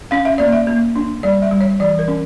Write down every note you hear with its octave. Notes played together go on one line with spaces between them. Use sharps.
C#4 F5
E5
A#3 D5
E5
A#3
D4
G3 D5
E5
G3
C#5
E3 D5
A#4
C#4